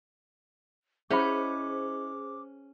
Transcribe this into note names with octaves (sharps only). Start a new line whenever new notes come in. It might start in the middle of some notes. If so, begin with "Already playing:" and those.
C#4 E4 G#4 C5 D#5 B5 D6